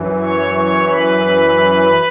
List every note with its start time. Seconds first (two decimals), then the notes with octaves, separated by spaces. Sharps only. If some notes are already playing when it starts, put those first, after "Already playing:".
Already playing: F#2 E3
0.21 C#5 C#6
0.54 C#5 C#6
0.89 B4 B5